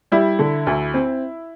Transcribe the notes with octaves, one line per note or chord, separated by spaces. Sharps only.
G3 E4
D3
D2
C4